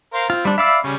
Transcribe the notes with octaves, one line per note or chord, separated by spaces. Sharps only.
A#4 C5 F5
C4 F4
G3 D4
D5 E5 F5 B5 E6
C#3 G3 C#4